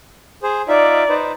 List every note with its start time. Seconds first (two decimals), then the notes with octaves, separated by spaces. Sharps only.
0.43 G#4 C5
0.68 D#4 F4 D5 E5
1.09 D#4 B4 C5